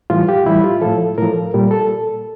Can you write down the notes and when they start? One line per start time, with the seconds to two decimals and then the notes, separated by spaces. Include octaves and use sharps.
0.10 A2 E3 G3 F4
0.29 G4
0.46 A2 E3 G3 E4
0.64 F4
0.82 A2 F3 A4
1.18 A2 F3 A#4
1.54 A#2 G3
1.71 A4